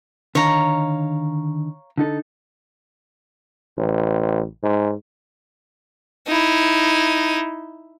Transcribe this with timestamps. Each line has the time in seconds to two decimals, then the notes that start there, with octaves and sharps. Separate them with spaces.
0.35 D3 D#3 C#5 F5 A#5
1.98 D3 D#4 A4
3.77 A1
4.63 G#2
6.27 D#4 E4